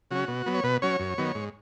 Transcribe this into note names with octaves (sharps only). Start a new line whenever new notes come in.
C#3 F#3 C#4 F#4
B2
F#3 B3
C#5
B2 B4
F#3 C#4 C#5
F#2
D#3 F#3 B3
G#2